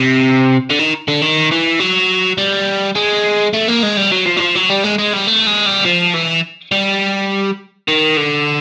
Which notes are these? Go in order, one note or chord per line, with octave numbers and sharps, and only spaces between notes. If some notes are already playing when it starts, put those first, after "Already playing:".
Already playing: C3
D3
D#3
D3
D#3
E3
F#3
G3
G#3
A3
A#3
G#3
G3
F#3
F3
F#3
F3
F#3
G3
G#3
G#3
G3
A3
G#3
G3
F3
E3
G3
D#3
D3